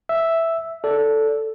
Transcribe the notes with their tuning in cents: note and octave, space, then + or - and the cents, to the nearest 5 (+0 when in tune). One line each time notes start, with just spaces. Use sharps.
E5 +0 E6 +0
A4 +0 D5 -30